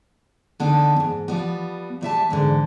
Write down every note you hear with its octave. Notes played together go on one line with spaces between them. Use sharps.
D3 B3 D4 D#4
F2 G#2
F3 G3 B3
A#2 G3 E5 A5
E2 G#2 D3